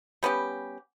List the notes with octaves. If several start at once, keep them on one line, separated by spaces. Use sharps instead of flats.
G3 B3 C#4 G4